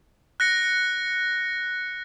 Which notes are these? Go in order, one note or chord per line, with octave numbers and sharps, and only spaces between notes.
F#6 A#6 C#7